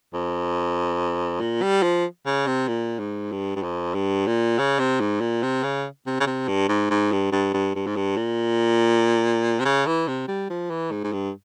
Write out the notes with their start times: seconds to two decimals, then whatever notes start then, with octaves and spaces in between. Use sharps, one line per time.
0.14 F2
1.40 A#2
1.62 G3
1.83 F3
2.26 C#3
2.47 C3
2.68 A#2
2.99 G#2
3.32 G2
3.56 G2
3.63 F2
3.94 G2
4.27 A#2
4.58 C#3
4.79 C3
5.00 G#2
5.21 A#2
5.43 C3
5.63 C#3
6.06 C3
6.20 C#3
6.26 C3
6.48 G2
6.69 G#2
6.90 G#2
7.12 G2
7.32 G2
7.53 G2
7.75 G2
7.87 G#2
7.96 G2
8.17 A#2
9.60 C3
9.65 C#3
9.86 E3
10.08 C3
10.28 G3
10.50 F3
10.70 E3
10.91 G#2
11.04 G#2
11.13 G2